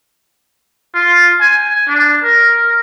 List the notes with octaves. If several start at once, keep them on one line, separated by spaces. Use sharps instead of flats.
F4
G#5
D4
A#4